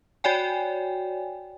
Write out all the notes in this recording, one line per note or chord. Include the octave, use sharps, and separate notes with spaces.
F#4 C#5 D5 G5 G#5